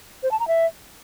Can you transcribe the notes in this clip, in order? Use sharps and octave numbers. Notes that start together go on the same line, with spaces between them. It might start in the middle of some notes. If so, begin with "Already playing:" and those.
C5
A5
A#5
E5